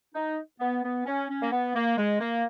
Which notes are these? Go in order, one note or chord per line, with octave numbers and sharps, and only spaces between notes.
D#4
B3
B3
C#4
C#4
A#3
B3
A#3
G#3
A#3